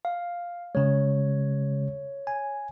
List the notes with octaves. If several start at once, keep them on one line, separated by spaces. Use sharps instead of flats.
F5
C#3 G#3 C#5
G#5